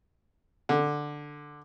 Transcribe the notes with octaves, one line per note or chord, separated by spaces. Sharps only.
D3